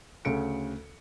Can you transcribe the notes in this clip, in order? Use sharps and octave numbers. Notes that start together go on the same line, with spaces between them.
D2 C#3 A4 C#7 D7